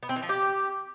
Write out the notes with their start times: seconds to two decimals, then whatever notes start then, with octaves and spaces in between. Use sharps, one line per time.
0.03 B3
0.09 C4
0.16 E3
0.23 F3
0.29 G4